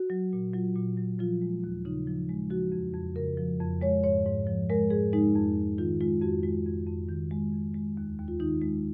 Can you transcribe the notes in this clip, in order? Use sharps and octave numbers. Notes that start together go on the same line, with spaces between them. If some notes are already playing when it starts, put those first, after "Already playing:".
Already playing: F#4
F#3
A#2
F#3 F4
A#2
F#3
F3 F4
G#3
D#2
C#3 D#4
F3
G#3
F3 F#4
F2
F2
C#3 A#4
F3
F2
G#3 C#5
G#2 C#5
G#2
F3
G#3 A#4
G#2 G#4
G#3 D#4
F2
F2
D#3 F4
G#3 F4
F2 F#4
G#3 F4
F2
F2
D#3
G#3
F2
G#3
D#2
D#2
F4
D#3 D#4
G#3